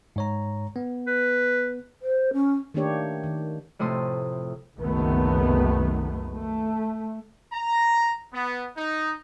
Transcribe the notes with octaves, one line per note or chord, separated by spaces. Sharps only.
G#2 C#5 A#5
B3
B4
C5
C#4
D#3 A3 A#3 D4 G4 C#5
D#3
F2 A2 C3 C6 D#6
F#1 C2 D#3 F#3 A3 B3
A3
A#5
B3
D#4